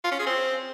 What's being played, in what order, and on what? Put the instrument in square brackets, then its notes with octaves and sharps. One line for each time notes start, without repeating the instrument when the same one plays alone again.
[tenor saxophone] F4
C#4
G#4
C4